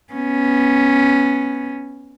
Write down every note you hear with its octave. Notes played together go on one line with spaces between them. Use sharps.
B3 C#4